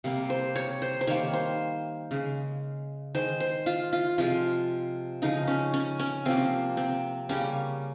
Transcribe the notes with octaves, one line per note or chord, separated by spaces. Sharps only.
C3 G3 A#3
C5
C#5
C5
C5
D#3 G3 A#3 C#5
C5
C#3 G#3
D#3 G#3 C5
C5
F4
F4
C3 F3 G#3 F4
C#3 F3 G#3 D#4
C#4
C#4
C#4
C3 F3 A#3 C4
C4
C#3 G3 A#3 C#4